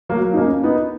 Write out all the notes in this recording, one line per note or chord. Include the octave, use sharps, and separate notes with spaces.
F#3 A#3
D#4
A#3 C#4
B3 D#4